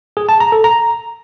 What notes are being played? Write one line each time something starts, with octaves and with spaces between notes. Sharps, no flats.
G#4
A5
A#5
A4
A#5